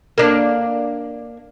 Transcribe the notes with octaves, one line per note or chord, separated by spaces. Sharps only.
A#3 D4